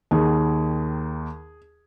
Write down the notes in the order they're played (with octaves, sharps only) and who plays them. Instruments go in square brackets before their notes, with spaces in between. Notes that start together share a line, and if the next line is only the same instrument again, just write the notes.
[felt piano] D#2 D#3 G#4